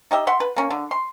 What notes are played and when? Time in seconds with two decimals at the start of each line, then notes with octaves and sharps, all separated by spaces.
0.11 D#4 G4 D#5 E5
0.27 E5 F#5 C6
0.40 B4
0.56 A#3 C#4
0.70 D3
0.91 C6